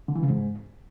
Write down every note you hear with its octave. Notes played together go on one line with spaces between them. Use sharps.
D3
E3
C#3
G#2